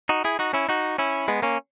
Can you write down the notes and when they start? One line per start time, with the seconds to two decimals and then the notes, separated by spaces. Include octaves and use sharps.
0.09 D#4 F#4
0.25 E4 G#4
0.39 D#4 F#4
0.54 C#4 E4
0.69 D#4 F#4
0.98 C#4 E4
1.28 G#3 B3
1.42 A#3 C#4